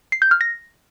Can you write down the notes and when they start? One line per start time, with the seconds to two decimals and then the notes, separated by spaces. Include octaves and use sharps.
0.12 C7
0.22 G6
0.31 F6
0.41 A#6